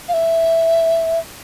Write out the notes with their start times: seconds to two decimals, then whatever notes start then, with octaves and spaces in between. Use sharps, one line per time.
0.09 F5
0.14 E5